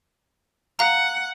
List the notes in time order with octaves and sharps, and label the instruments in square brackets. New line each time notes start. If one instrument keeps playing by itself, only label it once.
[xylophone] F5 A#5 [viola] F#5